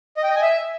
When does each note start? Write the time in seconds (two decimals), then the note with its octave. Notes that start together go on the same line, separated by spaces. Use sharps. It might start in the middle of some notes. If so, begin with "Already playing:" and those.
0.17 D#5
0.23 G5
0.30 D#5
0.36 G#5
0.42 E5